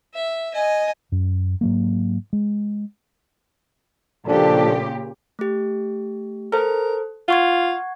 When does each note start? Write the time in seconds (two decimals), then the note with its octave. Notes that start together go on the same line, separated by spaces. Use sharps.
0.14 E5
0.54 D#5 G#5
1.12 F#2
1.61 G#2 F#3 A#3
2.33 G#3
4.27 A#2 C#3 F3 D4 G4 A4
5.39 A3 G4
6.52 A4 A#4 C5
7.28 F4 F#5 C#6 G#6